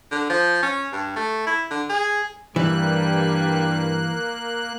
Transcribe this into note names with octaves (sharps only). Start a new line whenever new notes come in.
D3
F3
C#4
G2
A3
E4
D3
G#4
G2 E3 G3 A#3 F#6